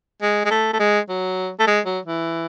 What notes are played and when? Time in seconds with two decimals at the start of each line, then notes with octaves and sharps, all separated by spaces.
0.22 G#3
0.45 G#3
0.51 A3
0.73 A3
0.79 G#3
1.09 F#3
1.59 A3
1.67 G#3
1.85 F#3
2.05 E3